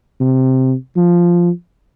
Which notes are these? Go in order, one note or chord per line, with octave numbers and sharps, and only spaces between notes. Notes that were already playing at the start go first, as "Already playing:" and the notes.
C3
F3